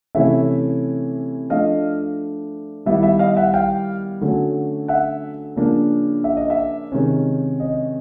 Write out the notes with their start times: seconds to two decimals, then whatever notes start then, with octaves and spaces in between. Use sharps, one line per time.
0.15 C3 E3 A3 C#4 E4 E5
1.50 F3 A3 D4 D#5 F5
2.86 D#3 G3 B3 E4 E5
3.03 E5
3.19 D#5 F5
3.36 E5 F#5
3.54 F5 G5
4.21 D3 F#3 A3 C#4
4.88 E5 F#5
5.56 C#3 F3 A#3 D4
6.24 E5
6.37 D#5
6.50 E5
6.92 C3 D#3 G#3 C#4
7.60 D#5